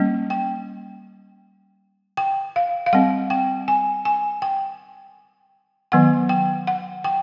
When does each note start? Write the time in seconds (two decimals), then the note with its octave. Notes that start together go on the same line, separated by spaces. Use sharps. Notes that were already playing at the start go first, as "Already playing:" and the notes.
Already playing: G3 A#3 C#4
0.30 G5
2.17 G5
2.56 F5
2.86 F5
2.93 G3 C4 F#5
3.30 G5
3.68 G#5
4.05 G#5
4.42 G5
5.92 D#3 F#3 B3 F#5
6.29 G5
6.67 F#5
7.04 G5